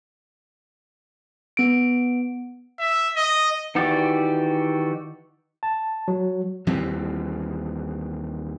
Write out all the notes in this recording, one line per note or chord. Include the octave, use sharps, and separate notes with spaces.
B3 D7
E5
D#5
D#3 E3 F#4 G4 D5
A5
F#3
D#2 E3 G3 C4